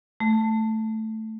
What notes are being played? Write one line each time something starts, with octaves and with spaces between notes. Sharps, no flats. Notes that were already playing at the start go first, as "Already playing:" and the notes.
A3